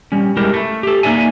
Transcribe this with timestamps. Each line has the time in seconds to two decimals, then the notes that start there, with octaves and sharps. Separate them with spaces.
0.12 G3 C#4
0.37 G#3 E4 G4 A#4
0.54 A3
0.83 G4 A4
1.03 A#3 D#4 D5 E5 G#5